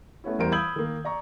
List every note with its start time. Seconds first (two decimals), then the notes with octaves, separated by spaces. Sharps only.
0.24 A3 B3 C#4 E4
0.39 E2 E3 G3 A#4 C5 D7
0.52 B5 D#6 E6 G6 G#6 F#7
0.76 D#3 A#3
1.05 D5 A#5 C#6